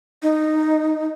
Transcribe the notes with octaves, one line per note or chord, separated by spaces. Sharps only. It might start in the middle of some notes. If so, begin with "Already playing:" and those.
D#4